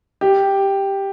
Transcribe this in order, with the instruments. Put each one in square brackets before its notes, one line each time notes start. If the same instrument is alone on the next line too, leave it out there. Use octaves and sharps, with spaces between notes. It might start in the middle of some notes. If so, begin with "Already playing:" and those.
[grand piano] G4